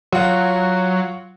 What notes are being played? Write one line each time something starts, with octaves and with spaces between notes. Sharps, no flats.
F#3 F4 F#5